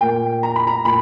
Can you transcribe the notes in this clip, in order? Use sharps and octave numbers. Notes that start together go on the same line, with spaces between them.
A#2 A#3 G5
A#5
B5
A#5
A#2 B5